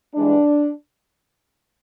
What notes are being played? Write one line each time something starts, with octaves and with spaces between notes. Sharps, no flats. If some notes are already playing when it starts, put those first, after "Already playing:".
G2 E3 G#3 D4